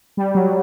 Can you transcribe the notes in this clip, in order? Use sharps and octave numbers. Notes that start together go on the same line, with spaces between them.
G3
F#3